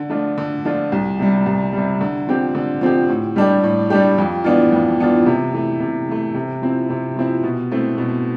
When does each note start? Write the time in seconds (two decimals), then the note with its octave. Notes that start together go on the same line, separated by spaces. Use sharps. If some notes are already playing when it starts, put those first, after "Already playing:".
Already playing: D3
0.10 F3 A3 D4 F4
0.38 D3
0.65 F3 A3 D4 F4
0.92 C2
1.19 C3 G3
1.46 C2
1.73 C3 G3
2.01 D3
2.27 F3 C4 G4
2.55 D3
2.81 F3 C4 G4
3.08 A2
3.36 G3 D4 G4
3.63 A2
3.90 G3 D4 G4
4.18 F2
4.44 E3 B3 D4 F4
4.72 F2
4.99 E3 B3 D4 F4
5.26 C3
5.53 E3 A3
5.80 C3
6.09 E3 A3
6.34 C3
6.62 F3 C4 E4
6.90 C3
7.16 F3 C4 E4
7.43 B2
7.71 A3 C4 E4
7.98 B2